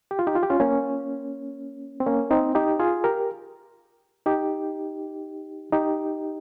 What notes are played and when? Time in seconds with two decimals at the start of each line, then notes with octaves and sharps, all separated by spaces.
0.11 G4
0.19 F4
0.27 D#4 G4
0.35 F4
0.43 G4
0.50 C#4 F4
0.60 A#3 C#4
2.00 C4
2.06 A#3 C#4
2.31 C4 D#4
2.55 D#4 G4
2.79 F4 G#4
3.04 G4 A#4
4.26 D#4 G4
5.72 D#4 G4